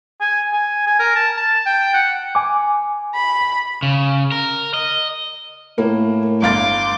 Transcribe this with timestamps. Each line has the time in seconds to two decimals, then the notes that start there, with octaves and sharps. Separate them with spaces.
0.21 G#5
0.53 G#5
0.87 G#5
0.99 A#4
1.15 A5
1.37 A5
1.66 G5
1.94 F#5
2.35 G#5 D6
3.15 B5
3.83 C#3
4.32 A#4
4.74 D#5
5.78 A2 A#3
6.42 G1 F5 C6 D6 A6